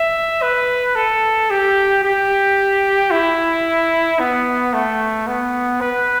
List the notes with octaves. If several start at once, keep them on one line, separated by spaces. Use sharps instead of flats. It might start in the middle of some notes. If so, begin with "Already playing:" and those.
Already playing: E5
B4
A4
G4
G4
E4
B3
A3
B3
B4